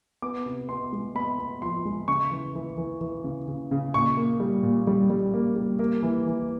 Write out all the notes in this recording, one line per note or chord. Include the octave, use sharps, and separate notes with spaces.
B3 D6
C3
B3 C6
G#3
B3 B5
B3
F3 C6
G#3
C#3 C#6
E3
E3
E3
E3
C#3
C#3
C#3
A#2 C#6
A#3
G3
A#2
G3
G3
A#3
G3
A#3
E3
E3